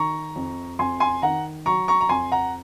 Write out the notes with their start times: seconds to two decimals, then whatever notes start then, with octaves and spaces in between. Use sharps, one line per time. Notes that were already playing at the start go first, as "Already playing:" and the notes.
Already playing: D#3 A#5 C#6
0.36 F2
0.79 F2 G#5 C6
1.00 G#5 C6
1.22 D#3 F#5 A#5
1.66 F#3 A#5 C#6
1.88 A#5 C#6
2.01 A#5
2.09 F2 G#5 C6
2.32 F#5 A#5